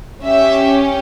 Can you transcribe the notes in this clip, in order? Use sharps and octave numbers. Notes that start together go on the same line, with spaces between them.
C#4 G4 E5